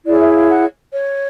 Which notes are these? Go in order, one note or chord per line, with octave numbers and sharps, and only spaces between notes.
E4 G#4 C#5 D5
E5
F5
F#5
C#5